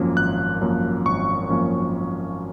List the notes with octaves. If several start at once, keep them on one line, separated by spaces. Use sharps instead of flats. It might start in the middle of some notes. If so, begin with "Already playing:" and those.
Already playing: G#1 F#2 F3 A#3 C#4
G#1 F#6
F#2 F3 A#3 C#4
G#1 C#6
F#2 F3 A#3 C#4